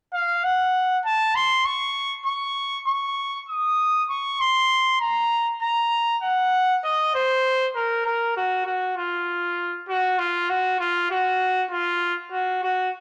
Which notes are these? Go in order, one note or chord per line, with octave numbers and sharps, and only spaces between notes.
F5
F#5
A5
C6
C#6
C#6
C#6
D#6
C#6
C6
A#5
A#5
F#5
D#5
C5
A#4
A#4
F#4
F#4
F4
F#4
F4
F#4
F4
F#4
F4
F#4
F#4